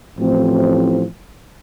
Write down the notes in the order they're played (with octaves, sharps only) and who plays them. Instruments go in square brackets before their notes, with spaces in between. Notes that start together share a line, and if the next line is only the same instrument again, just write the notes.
[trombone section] A1 A2 F3 C4